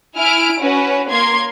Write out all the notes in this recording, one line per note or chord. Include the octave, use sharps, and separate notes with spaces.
E4 G#5 F6 D7
C#4 F#4 B4
A#3 A#4 C6 G#6